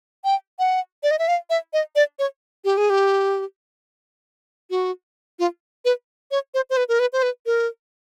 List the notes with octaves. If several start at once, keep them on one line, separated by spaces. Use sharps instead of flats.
G5
F#5
D5
D#5
E5
F5
E5
D#5
D5
C#5
G4
G#4
G4
F#4
F4
B4
C#5
C5
C5
B4
A#4
B4
C5
B4
A#4